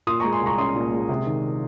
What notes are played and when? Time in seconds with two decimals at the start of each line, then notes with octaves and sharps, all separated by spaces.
0.07 A#2 C6 D#6
0.20 G#3 A#5 C#6
0.33 G#5 C6
0.41 C2 A#5 C#6
0.58 C#4 C6 D#6
0.76 A#2
0.93 G#3
1.09 C3
1.26 D#3